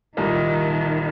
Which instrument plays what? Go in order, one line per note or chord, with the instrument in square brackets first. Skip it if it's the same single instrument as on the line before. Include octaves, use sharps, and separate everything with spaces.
[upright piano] C2 A#2 G3 A#3 D#4 [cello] D#3